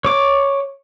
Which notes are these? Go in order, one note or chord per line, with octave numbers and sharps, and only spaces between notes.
C#5 D6